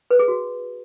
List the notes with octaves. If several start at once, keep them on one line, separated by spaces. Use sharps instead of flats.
B4
G#4
F#4